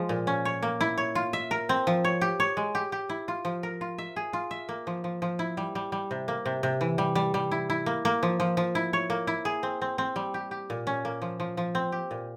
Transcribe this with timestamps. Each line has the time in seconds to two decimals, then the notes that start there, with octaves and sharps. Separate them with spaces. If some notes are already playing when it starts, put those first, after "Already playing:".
Already playing: F3 G#3
0.09 A#2
0.27 C#4
0.45 C#5
0.62 A#3
0.81 E4
0.98 C#5
1.15 F4
1.33 E5
1.51 A#4
1.69 C4
1.87 F3
2.04 C#5
2.21 G4
2.40 C#5
2.57 G#3
2.75 G4
2.92 G4
3.09 E4
3.28 F4
3.45 F3
3.63 A#4
3.81 F4
3.98 E5
4.16 G#4
4.33 F4
4.51 E5
4.69 A#3
4.87 F3
5.04 F3
5.22 F3
5.39 E4
5.57 G3
5.75 G3
5.92 G3
6.11 C3
6.28 A#3
6.46 C3
6.63 C3
6.81 E3
6.98 G3
7.15 G3
7.34 G3
7.51 E4
7.70 E4
7.86 A#3
8.05 A#3
8.23 F3
8.40 F3
8.57 F3
8.75 E4
8.93 C#5
9.10 A#3
9.27 E4
9.45 G#4
9.63 C4
9.82 C4
9.98 C4
10.16 G3
10.34 G4
10.51 G4
10.70 A#2
10.87 C#4
11.05 A#3
11.22 F3
11.40 F3
11.57 F3
11.75 C4
11.92 G4
12.11 A#2